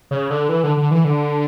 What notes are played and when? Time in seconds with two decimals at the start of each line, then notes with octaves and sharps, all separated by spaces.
0.11 C#3
0.30 D3
0.49 E3
0.64 D3
0.77 D3
0.91 E3
1.05 D3